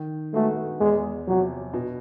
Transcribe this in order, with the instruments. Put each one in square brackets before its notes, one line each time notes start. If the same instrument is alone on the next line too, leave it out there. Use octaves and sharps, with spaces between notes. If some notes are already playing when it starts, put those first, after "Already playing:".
Already playing: [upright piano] D#3
[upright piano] G#3 B3 D#4 F#4 [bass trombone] A3
[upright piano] E2 [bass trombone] G#3
[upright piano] C3 F3 [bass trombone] F#3
[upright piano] B2